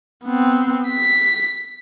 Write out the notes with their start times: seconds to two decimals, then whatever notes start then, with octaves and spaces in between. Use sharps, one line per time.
0.25 B3 C4
0.89 B6